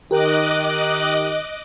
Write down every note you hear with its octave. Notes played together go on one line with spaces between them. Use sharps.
D#3 G4 A#4 D#5 G5 D6 F#6